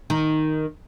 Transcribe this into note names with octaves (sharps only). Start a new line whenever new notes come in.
D#3 D#4